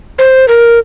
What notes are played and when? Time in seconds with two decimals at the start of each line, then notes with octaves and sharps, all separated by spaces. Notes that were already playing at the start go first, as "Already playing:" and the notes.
0.19 C5
0.48 A#4